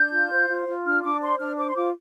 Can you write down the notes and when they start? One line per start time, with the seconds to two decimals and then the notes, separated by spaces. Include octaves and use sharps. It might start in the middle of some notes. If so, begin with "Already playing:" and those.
Already playing: D4 G6
0.12 F4
0.31 C5
0.49 F4
0.67 F4
0.85 D4 F6
1.03 D4 D6
1.21 C5 C6
1.39 D4 F6
1.57 C5 D6
1.69 C6
1.76 F4 D6